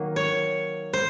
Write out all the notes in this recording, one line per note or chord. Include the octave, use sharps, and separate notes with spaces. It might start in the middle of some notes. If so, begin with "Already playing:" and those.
Already playing: D#3 F#3 A#3
C#5
C5